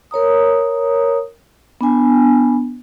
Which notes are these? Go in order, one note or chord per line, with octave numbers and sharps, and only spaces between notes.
A#4 C#5 A#5 D#6
B3 D4 G#5